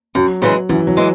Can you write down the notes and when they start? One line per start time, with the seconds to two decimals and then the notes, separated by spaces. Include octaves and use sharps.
0.15 F#2 F#3
0.42 C#3 E3 G#3
0.69 F#2 E3
0.87 F#3
0.97 E3 G#3